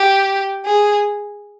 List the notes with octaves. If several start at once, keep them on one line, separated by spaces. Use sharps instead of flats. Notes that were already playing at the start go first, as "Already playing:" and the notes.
Already playing: G4
G#4